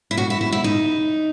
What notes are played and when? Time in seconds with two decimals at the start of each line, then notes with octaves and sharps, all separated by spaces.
0.11 E4
0.17 F#4
0.30 E4
0.41 E4
0.52 E4
0.64 D#4